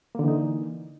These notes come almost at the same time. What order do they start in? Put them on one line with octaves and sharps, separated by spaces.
A#3 D3 E3 D#4